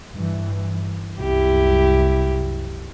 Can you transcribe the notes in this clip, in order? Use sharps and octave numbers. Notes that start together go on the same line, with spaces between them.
G2 E3
C2 F#2 E4 G4